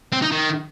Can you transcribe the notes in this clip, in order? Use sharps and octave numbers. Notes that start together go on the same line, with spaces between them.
C4
D#4
D#3